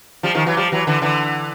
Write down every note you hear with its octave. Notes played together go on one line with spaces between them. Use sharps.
F3 G3
D#3 F3
E3 F#3
F3 G3
E3 F#3
D3 E3
D3 E3